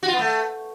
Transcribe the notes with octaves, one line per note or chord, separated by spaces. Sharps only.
F#4
F4
B3
A3